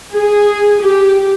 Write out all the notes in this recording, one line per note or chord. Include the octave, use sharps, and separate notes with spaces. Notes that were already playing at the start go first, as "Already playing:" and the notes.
G#4
G4